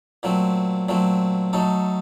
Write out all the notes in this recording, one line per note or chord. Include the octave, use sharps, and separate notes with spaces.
A#2 F#3 A3 C4
A#2 F#3 A3 C4
F#3 A3 D#4 A4